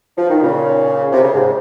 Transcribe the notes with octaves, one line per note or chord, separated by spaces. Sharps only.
F3
D#3
A#2 C#3
C3
C#3
G#2 C3